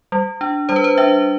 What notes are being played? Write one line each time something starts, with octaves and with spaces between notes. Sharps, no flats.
G3
D4
G3 C5
B4
C5
D4 E5